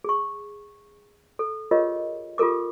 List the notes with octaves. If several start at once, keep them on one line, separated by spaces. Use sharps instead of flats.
G#4 C#6
A4
F4 G4 G#4 A#4 C#5 D#5
F4 G4 A4 A#4 D6